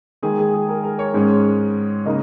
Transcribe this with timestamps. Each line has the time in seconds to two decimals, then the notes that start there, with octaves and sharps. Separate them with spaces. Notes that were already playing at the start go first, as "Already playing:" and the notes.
0.22 D#3 G#3 D#4 G#4
0.39 G#4
0.54 G#4
0.69 A#4
0.84 A#4
0.99 C#5
1.14 G#2 G#3 C#4
2.05 C#3 A#3 D#4 D#5